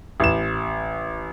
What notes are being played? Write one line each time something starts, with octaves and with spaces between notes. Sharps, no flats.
A1 E7